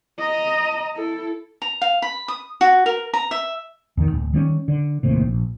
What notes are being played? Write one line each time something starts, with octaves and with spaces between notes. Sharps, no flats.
D#5 A#5
E4 A4
A#5
F5
B5
D#6
F#4
A#4
A#5
E5
E2 D#3
D1
D#3 G3 C4 C#4
D3
D#1 D#2 A2 C3
A#1